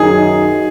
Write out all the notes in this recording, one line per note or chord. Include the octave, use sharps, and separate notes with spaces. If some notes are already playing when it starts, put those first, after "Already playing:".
Already playing: F#2 D#3 F#3 D#4 G#4